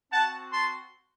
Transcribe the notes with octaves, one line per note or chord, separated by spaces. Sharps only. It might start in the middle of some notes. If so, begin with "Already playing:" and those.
C4 F#4 F#5 A5
A5 C6